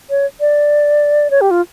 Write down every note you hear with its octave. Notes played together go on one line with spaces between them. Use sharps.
C#5
D5
C#5
G4
F4